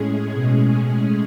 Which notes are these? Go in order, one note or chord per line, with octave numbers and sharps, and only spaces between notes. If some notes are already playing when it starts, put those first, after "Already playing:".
Already playing: A2 G#3 C#4 G#4
B2